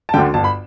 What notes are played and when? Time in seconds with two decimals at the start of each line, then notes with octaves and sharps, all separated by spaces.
0.09 A5
0.14 D2 D3 G5
0.34 G1 A5
0.44 B5